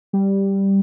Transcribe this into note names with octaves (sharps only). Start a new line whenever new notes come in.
G3